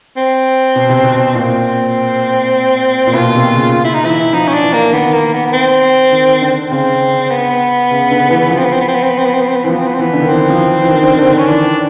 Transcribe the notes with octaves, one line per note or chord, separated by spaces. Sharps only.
C4
B2
C3
B2
A#2 C4
A#2
B2 F4
C3
C#3
F4
E4
D#4
E3 E4
F3 D#4
C#4
D4
E3
A#3
D#3 B3
A#3
B3
B3
C4
D#3
D3
C#3 C4
B3
C#3
D3
E3
F3 B3
C4
B3
C4
B3
C4
B3
C4
B3
C4
B3
C4
B3
C4
B3
E3 C4
F3 B3
C4
B3
C4
E3 B3
D3
D#3
E3 C4
F3
E3
E3
D#3
D3
D#3
D3
D#3
C#4
E3 D4